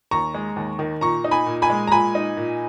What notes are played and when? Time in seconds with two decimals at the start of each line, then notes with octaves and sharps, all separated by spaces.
0.11 D#2 A#5 C#6
0.35 G#3
0.56 D#2
0.79 D#3
1.01 A#2 A#5 C#6
1.24 D#4
1.31 G#5 B5
1.46 A#2
1.62 G#5 B5
1.70 G#3
1.87 A#5
1.92 A#2 G#5 B5
2.15 D#4
2.37 A#2